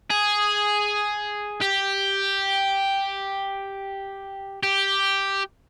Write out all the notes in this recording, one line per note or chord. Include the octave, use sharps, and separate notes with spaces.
G#4
G4
G4